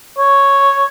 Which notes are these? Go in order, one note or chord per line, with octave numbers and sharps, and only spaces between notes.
C#5